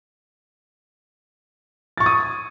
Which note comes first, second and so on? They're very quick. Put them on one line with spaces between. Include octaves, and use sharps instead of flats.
A6 C#6 G#6 D#6